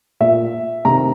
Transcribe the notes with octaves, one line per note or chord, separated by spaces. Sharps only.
A#2 E5
C3 D#3 A#5